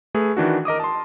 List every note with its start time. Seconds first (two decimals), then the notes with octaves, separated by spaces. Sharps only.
0.15 A3 G#4 B4
0.37 D#3 E3 D4 F#4
0.65 A#4 D#5 D6 D#6
0.80 A5 C6